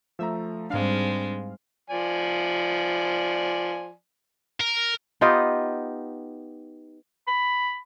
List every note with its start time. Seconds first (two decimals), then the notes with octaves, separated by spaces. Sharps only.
0.19 F3 A3 E5 A#5
0.70 G#2 G3 G#3 C4 D4 F5
1.90 F3 D5 G#5
4.61 A#4
5.21 B3 D#4 F4 G4
7.28 B5